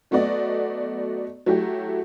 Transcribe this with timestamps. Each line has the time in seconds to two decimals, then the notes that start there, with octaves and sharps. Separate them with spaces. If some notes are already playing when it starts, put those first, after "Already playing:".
0.11 F#3 A3 B3 F#4 D5 D#5
1.46 F#3 A3 E4 F#4 G4